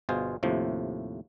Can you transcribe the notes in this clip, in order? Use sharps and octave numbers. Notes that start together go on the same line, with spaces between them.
G1 B2 F4 G#4 C5
D#2 A2 C3 F3